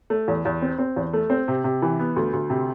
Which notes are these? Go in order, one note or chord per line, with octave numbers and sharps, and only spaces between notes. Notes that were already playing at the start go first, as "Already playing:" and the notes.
A3
E2
E2
C4
C4
E2
A3
C4
C3
C3
E3
B3
D2
D2
C3